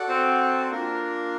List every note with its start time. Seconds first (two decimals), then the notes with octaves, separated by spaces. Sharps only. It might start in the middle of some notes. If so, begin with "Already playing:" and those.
Already playing: F#4 A4 D5 F#5
0.08 C4
0.71 A#3 D4 F4 A#4